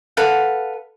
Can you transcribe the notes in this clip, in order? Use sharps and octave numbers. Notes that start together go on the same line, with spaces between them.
A4 B4 F5 F#5